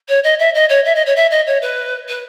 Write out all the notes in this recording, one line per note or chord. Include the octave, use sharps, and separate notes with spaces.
C#5
D#5
E5
D#5
C#5
E5
D#5
C#5
E5
D#5
C#5
B4
B4